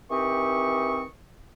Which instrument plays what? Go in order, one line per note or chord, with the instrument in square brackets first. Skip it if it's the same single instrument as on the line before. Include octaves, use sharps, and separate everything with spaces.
[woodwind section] D#3 E3 C4 G4 C#6 D#6